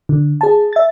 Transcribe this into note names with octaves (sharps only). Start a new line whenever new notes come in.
D3
G#4 A5
E5 A6